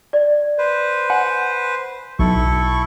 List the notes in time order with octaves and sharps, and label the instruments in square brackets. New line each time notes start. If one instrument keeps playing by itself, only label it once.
[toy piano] D5
[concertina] B4 C5
[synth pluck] F#5 [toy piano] G#5
[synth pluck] B1 [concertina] E4 A4 C#6